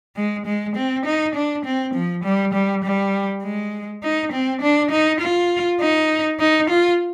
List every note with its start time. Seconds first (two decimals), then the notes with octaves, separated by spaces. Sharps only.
0.16 G#3
0.46 G#3
0.76 C4
1.06 D#4
1.35 D4
1.65 C4
1.94 F3
2.24 G3
2.54 G3
2.84 G3
3.43 G#3
4.03 D#4
4.32 C4
4.62 D4
4.91 D#4
5.21 F4
5.81 D#4
6.40 D#4
6.70 F4